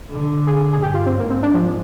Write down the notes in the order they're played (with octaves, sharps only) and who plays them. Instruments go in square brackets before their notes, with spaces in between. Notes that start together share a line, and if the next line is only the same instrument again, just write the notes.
[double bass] D3
[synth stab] G#4
G#4
[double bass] G2 [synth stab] G4
[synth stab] F4
C4
[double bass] G#2 [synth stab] A#3
[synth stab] C4
D4
F3